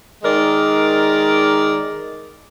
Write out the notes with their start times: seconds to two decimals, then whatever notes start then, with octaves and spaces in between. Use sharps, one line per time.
0.22 D#3 G#3 A#4 D5